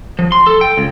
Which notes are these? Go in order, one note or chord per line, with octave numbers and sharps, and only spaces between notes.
F3
C6
A4
G5
C#2